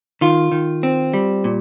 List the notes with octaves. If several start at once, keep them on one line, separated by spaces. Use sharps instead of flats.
D#3 F4
D#3
C4
G3
A#2